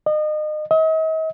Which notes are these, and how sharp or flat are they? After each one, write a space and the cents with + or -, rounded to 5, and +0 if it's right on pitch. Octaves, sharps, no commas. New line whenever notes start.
D#5 -30
D#5 +45